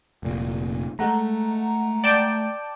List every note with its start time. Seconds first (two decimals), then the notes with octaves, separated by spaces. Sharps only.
0.23 F1 A#2
0.99 G#3 A3 F#5 A#5
2.04 D5 G5 A5